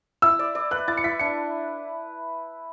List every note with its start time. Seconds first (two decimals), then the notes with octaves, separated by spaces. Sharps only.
0.22 E4 E6
0.39 D5
0.55 D5
0.71 B4 F#6
0.88 E4 A6
0.97 C#7
1.04 E4 B6
1.19 D4 C#7